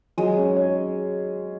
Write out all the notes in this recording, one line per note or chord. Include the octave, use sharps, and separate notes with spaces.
F#3 G#3
C#4
C#5